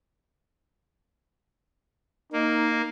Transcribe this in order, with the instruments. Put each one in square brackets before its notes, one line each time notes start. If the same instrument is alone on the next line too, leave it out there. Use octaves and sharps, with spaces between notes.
[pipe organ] A#3 [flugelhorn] D#4